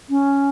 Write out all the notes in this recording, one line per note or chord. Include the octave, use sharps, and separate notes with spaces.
C#4